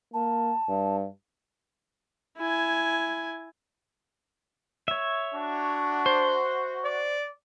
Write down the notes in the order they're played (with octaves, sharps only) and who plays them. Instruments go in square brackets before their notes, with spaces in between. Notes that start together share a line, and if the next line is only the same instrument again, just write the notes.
[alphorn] A#3 [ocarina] A5
[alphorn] G2
[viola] E4 G#5
[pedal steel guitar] C#5 E5
[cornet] D4 [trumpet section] F#4
[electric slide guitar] C5
[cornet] D5